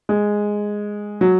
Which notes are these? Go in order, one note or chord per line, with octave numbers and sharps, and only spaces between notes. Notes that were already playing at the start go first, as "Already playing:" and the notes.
G#3
F#3